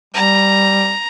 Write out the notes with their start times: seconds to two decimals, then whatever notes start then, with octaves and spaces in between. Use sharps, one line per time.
0.14 G3 A#5